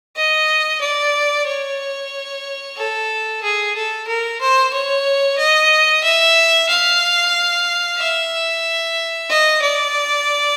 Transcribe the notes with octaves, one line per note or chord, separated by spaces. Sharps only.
D#5
D5
C#5
A4
G#4
A4
A#4
C5
C#5
D#5
E5
F5
E5
D#5
D5